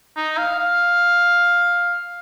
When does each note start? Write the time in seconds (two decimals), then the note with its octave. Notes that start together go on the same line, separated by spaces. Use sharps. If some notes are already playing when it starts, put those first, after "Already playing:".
0.16 D#4
0.38 F5
0.59 F5